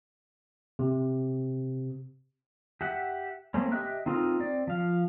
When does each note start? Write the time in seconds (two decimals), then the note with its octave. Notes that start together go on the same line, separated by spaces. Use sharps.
0.79 C3
2.81 G4 E5 F#5
3.54 A3 A#3 C4 C#4
3.72 G4 D#5 E5 G5 F#6
4.06 C4 D#4 F4 A4 A#4
4.39 C4 D5
4.67 F3 F5